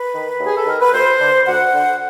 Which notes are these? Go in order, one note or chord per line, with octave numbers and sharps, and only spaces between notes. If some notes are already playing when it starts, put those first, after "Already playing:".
Already playing: B4
D#3
D#2
G#4
A4
D#3 A#4
B4
D2 C5
D3
D2 F#5
D3